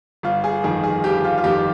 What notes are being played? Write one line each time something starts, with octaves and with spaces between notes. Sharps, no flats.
G1 F4
G#4
F2 D#3 G#4
G#4
G1 G4
F4
F4
F2 D#3 G4